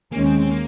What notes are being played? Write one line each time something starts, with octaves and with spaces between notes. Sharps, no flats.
D#2 D#3 G#3 A#3 C#4
C4
C4
A#3